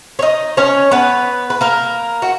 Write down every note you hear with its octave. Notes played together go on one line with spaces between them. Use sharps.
C#5
D#4 D#5
C#4 C#5
B3 B4
B4
A#3 A#4
F#4